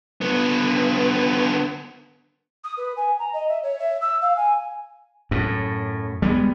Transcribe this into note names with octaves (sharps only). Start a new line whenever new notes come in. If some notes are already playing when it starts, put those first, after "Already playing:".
D3 B3
D#6
B4
G#5
A#5
D#5
E5
C#5
E5
E6
F5
G#5
F#2 A2
G3 G#3 B3